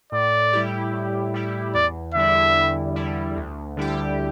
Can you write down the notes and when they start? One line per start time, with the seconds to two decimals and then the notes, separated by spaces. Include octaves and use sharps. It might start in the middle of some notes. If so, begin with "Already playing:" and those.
0.12 A2 D5
0.53 G3 E4 G4
0.93 A2
1.34 G3 E4 G4
1.74 E2 D5
2.14 D3 G3 E4 E5
2.55 E2
2.96 D3 G3 E4
3.36 D2
3.77 D3 G3 E4 G4